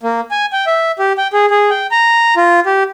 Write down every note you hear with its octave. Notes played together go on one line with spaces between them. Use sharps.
A#3
G#5
G5
E5
G4
G5
G#4
G#4
G5
A#5
F4
G4